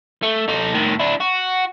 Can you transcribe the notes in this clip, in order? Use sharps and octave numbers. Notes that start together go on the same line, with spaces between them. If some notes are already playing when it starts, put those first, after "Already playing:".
A3
D#4 A4
A2 D#3
D4 E4
F#4